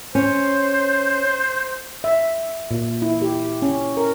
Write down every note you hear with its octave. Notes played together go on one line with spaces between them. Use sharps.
C#4 C5
E5
A#2
E4
G4
C#4
A#4